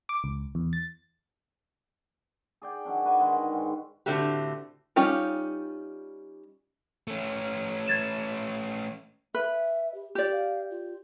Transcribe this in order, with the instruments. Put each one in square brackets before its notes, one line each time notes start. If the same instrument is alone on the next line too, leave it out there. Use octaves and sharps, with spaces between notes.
[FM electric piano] D6
C#2
E2
A6
[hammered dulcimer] G#4 D5 G5
D#3 F#3 C#4 D4
F#4 B4 D5 G#5
D3 D#3 G#3
G#2
[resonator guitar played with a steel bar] A2 D3 A3 C4 F#4 G4
[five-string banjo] G3 C#4 D#4 F4 G4
[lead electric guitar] A3 C#4
[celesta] G#6 A6 E7
[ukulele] B4 [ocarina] E5
[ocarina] G4
[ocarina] F4 [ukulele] G4 D5
[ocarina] F5
F4